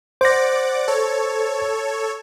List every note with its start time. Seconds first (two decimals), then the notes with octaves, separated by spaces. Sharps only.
0.21 C5 D5 F#5 D6 A#6
0.88 A4 C#5